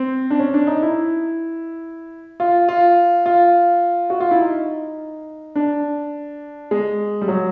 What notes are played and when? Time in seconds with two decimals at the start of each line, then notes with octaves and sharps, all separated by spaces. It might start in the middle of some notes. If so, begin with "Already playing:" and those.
Already playing: C4
0.30 D4
0.39 C#4
0.54 D4
0.67 D#4
0.82 E4
2.40 F4
2.69 F4
3.26 F4
4.10 F#4
4.20 F4
4.31 E4
4.41 D#4
5.55 D4
6.71 G#3
7.21 G3
7.28 F#3